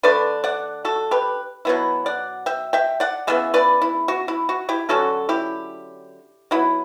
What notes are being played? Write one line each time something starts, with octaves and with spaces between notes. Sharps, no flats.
D3 A3 D4 B4 D5
D5 F#5
F#4 A4
G4 B4
B2 F#3 B3 E4
D5 F#5
E5 G5
E5 G5
D5 F#5
C#3 E3 B3 E5
B4 D5
E4
F#4
E4
F#4
E4 G4
D3 F#3 C#4 F#4 A4
E4 G4
F#3 B3 E4